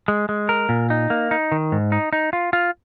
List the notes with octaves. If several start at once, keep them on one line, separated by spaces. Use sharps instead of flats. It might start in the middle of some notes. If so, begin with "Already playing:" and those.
G#3
G#3
A#4
A#2
D#4
A#3
D#4
D#3
G#2
D#4
D#4
F4
F4